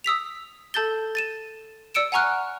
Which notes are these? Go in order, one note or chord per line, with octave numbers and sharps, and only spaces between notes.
D#6 E6 B6 F7
A4 A5 G6 A6 G7
A6 D#7 E7
D5 E6 C#7 D7 E7
F#5 G#5 A#5 C#6 F6 F#6